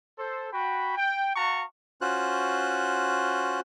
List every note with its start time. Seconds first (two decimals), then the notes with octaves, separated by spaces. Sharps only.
0.18 A4 C5
0.53 F#4 G5 B5
0.97 G5
1.36 F#4 F5 F#5 A5 A#5 C#6
2.01 C#4 F4 F#4 C5 F#6